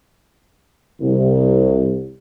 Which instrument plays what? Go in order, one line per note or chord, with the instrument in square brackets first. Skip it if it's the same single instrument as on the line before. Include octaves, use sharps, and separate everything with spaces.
[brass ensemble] C2